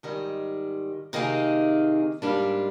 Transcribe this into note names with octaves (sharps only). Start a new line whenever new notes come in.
G#2 D#3 G3
C3 D#3 A#3 D#4 G#4
G#2 G3 A#3 D4